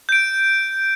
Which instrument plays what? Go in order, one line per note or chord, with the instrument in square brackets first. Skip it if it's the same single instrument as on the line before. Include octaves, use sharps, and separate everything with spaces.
[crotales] G6 D7